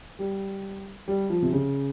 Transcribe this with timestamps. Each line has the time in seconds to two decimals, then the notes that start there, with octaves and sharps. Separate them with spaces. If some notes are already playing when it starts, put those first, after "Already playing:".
0.19 G3
1.08 G3
1.30 F3
1.42 C3
1.53 C#3